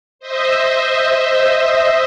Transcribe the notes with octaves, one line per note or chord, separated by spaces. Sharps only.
C5 D#5 E5